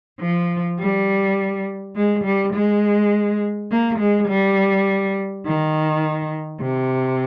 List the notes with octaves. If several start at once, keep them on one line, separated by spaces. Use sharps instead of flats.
F3
G3
G#3
G3
G#3
A#3
G#3
G3
D#3
C3